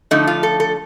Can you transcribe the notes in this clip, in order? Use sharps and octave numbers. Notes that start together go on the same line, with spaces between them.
D3 F3 A3 D#4
F4
A4
A4